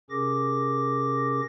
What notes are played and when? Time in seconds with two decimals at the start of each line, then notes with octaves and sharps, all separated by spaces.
0.10 C3 C#4 G#4 A#4 D6 A#6